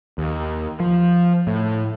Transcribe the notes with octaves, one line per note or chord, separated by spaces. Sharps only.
D#2
F3
A2